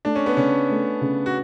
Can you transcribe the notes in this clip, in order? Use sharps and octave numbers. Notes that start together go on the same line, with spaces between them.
A3 D4
C#4
B3
C#3 C#4
A3
C#3
F#4